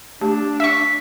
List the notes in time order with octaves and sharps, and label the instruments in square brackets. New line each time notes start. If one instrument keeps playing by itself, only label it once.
[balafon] A3 G4 A5 [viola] D4
[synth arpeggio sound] E5 C#6 [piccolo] B6